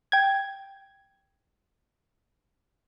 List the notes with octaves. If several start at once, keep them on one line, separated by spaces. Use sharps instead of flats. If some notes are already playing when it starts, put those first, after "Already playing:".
G5 G#6